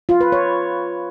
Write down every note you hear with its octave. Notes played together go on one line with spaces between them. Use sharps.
F4
B4
C#5